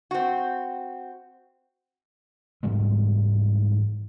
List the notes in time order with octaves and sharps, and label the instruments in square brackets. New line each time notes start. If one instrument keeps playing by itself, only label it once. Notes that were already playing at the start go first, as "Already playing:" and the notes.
[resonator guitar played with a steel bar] C4 F#4
[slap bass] G#2 E3 G3 G#3